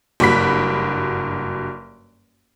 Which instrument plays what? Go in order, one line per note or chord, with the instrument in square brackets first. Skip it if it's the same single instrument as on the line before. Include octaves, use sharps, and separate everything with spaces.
[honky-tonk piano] F#1 G2 F#4 B5 B6